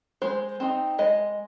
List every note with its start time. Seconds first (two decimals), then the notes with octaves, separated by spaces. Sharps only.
0.22 G#3 C5
0.60 C4 D#4
0.98 G#3 D#5